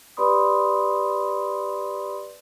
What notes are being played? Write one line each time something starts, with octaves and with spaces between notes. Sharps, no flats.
G4 B4 D5 B5 C6 D#6